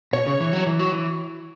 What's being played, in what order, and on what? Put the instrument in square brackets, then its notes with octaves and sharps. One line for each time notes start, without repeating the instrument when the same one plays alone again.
[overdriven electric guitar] B2 [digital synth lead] C#5
[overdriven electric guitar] C#3
E3
F#3
E3
F#3
E3